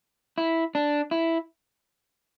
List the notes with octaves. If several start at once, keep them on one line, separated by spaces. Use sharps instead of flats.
E4
D4
E4